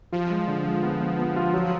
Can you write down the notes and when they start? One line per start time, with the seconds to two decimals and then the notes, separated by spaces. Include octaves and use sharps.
0.12 F3 F4
0.30 G#3
0.48 D3
0.65 G#3
0.83 B3
1.01 B3
1.18 B3
1.36 F4
1.53 F#3